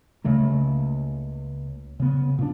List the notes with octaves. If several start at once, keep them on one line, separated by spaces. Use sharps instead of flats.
C#2 C#3 A3 A#3
C#3 B3
A#2 A#3 C4 D4